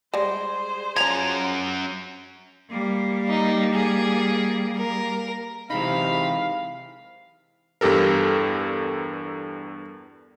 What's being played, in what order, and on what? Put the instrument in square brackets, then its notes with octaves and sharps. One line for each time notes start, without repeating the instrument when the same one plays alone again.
[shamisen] G3 G#3 [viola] G#4 C5
[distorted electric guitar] F#2 A#5 [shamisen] F3 C#4 [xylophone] G#6 F7
[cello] G3 A#3
[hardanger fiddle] D#4
G#4
A#4
[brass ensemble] C3 G#3 C4 [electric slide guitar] E3 D#4 [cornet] F5 [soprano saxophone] B5
[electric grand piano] E2 G2 G4 A4 A#4